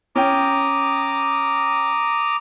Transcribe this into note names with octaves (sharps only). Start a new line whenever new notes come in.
C#4 G5 A#5 D6 D#6